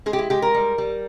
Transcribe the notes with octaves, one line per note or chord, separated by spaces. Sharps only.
G#3 G#4
G4
E4
G#3 G4
A#4
G3
G3